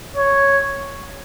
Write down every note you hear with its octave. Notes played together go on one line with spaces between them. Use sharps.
C#5